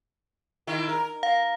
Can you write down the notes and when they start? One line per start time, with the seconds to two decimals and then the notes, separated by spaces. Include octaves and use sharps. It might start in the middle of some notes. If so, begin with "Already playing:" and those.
0.67 D#3 E4
0.89 A#4
1.23 F5